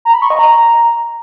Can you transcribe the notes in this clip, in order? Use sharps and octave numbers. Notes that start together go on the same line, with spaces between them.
A#5
B5
C#6
D#5
A#5